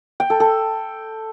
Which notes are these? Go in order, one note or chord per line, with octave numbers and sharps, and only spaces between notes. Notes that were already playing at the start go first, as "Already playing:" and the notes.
G5
A4
A4